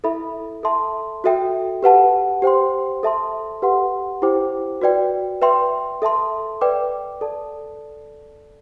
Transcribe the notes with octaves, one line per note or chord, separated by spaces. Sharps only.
E4 A4 E5 B5
A4 E5 A5 C6
F#4 A4 E5 G5
G4 B4 F#5 A5
G4 C5 G5 C6
A4 E5 A5 C6
G4 B4 F#5 C6
E4 G4 C5 G5 D6
F#4 B4 D5 G5
B4 E5 G5 C6
A4 E5 A5 C6
B4 D5 G5 D6
A4 D5 A5